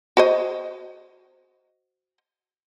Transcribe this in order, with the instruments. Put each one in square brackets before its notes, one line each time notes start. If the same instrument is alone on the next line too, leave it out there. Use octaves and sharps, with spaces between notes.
[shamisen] F#4 C5 D#5